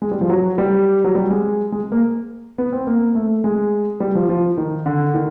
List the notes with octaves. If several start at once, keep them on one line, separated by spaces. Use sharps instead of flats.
G#3
G3
F3
F#3
G3
F#3
G3
G#3
G#3
A#3
B3
C4
A#3
A3
G#3
G3
F3
F3
D#3
D3
D#3